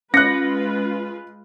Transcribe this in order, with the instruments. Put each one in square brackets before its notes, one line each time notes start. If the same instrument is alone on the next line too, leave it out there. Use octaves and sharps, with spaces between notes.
[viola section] G#3 F4 B4 [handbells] C#4 C#7 [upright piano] F#6 A#6